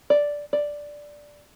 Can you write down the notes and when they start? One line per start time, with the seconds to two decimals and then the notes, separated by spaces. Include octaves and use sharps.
0.10 D5
0.53 D5